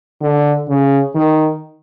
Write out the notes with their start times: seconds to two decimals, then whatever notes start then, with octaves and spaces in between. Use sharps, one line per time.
0.21 D3
0.68 C#3
1.15 D#3